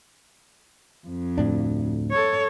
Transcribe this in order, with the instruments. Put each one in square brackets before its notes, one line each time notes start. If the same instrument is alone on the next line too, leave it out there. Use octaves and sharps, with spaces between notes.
[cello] F2
[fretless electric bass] D2 A2 D4
[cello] A4 C#5